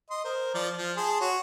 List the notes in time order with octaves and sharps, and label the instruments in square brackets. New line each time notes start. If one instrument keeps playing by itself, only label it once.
[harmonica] D#5 C6
A#4 C5
F3 D5
F3
G#4 A5 C6
F#4 C#5